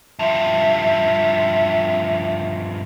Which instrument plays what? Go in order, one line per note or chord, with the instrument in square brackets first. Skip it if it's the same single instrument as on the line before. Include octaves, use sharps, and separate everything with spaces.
[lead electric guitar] G2 F3 [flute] E5